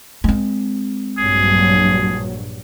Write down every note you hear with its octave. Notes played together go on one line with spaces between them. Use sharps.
G#3 C4
A#1 G2 F#3 G#4